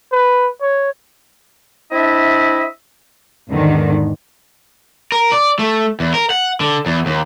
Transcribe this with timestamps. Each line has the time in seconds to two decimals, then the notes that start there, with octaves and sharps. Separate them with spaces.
0.12 B4
0.61 C#5
1.92 C4 D4 E4 D#5 E5
3.49 E2 G#2 D3 D#3
5.12 A#4
5.32 D5
5.59 A3
6.00 E2
6.14 A#4
6.30 F#5
6.60 D3
6.86 E2
7.06 D#2